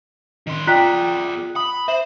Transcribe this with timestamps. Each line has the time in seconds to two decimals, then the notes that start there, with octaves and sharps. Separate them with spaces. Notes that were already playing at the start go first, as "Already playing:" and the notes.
0.47 D#3 C6
0.67 F4 G#4 D5 G5 A#5 F#6 B6
1.56 B5 D#6
1.88 C5 E5